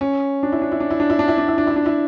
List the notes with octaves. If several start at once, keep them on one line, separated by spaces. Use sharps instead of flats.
C#4
D4
E4
D4
E4
D4
E4
D4
E4
D4
E4
D4
E4
D4
E4
D4
E4